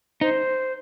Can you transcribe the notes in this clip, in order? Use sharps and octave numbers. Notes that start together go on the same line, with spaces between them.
D#4 C5